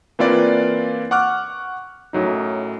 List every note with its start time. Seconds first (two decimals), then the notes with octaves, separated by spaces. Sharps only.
0.19 E3 A#3 C4 F4 B4 D5
1.11 F#5 C#6 D6 F6 F#6
2.13 F#2 A2 F#3 D#4